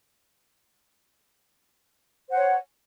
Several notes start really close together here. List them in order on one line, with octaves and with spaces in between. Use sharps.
C5 F#5 C#5